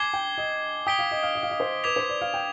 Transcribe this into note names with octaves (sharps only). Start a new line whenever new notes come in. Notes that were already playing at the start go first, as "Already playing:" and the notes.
Already playing: G#5 D6 G#6 C7 G7
G5
D#5
G5 D#6 B6 D7 G7
F5
D#5
F5
D#5
F5
D#5
C5
B4 D6 G#6 B6 F7
C5
D5
F5
G5